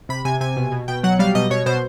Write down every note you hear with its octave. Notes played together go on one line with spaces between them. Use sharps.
C3 B5
C3 G#5
C3 G#5
B2
B2
B2 G5
F#3 F#5
G3 F5
B2 D#5
B2 C#5
B2 C5